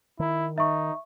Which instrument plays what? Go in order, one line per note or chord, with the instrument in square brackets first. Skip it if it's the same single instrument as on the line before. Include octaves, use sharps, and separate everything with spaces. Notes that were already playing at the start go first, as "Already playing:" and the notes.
[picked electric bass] D#3 [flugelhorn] E4
[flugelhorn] D#4 [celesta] E5 C#6